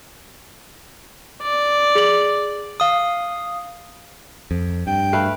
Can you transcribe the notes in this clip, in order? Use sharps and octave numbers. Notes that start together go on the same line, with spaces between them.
D5
G#4 F#7
F5 D#6
F2
G2 G5
A3 B4 F5